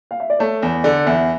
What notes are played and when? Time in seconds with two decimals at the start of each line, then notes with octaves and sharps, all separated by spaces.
0.11 F5
0.20 E5
0.30 D5
0.39 A3 C#5
0.62 E2
0.84 D3 D5
1.06 E2 E5